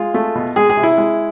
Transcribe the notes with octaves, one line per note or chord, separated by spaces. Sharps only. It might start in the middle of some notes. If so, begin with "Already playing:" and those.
Already playing: G#3 F4
A3
B2
G#3 G#4
G#4
C3
E4
G#3